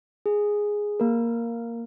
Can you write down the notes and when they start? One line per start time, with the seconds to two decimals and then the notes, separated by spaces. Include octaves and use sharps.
0.26 G#4
1.00 A#3 A#4